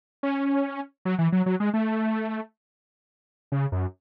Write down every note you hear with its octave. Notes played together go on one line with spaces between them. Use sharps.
C#4
F#3
E3
F#3
F#3
G#3
A3
C#3
F#2